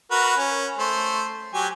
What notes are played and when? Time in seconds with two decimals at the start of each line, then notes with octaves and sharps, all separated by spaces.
0.11 F#4 A#4 B4
0.37 C#4
0.79 A3 C5
1.54 F#3 G4 G#5